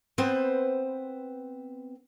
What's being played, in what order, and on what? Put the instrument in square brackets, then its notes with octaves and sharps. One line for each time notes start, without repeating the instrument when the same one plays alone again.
[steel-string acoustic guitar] B3 C4 B4 C5